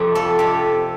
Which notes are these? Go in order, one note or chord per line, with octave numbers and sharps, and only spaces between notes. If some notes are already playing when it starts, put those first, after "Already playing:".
Already playing: F2 C3 A3 G4
F3 A4
C3 G4